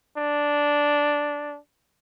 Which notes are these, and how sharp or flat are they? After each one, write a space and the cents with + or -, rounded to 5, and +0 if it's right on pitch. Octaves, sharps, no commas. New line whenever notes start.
D4 -5